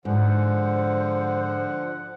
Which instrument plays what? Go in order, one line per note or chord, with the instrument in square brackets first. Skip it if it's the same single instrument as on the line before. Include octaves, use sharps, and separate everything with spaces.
[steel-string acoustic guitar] G#2 [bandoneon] D3 F3 [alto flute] C5 [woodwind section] F#5